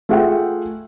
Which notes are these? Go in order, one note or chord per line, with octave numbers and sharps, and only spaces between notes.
A3 F4 G#4 E5 F#5 G5